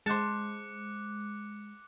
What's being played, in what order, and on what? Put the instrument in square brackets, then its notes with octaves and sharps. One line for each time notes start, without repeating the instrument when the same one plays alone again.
[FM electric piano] G#3 [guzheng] C5 A5 [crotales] D6 F#6 C#7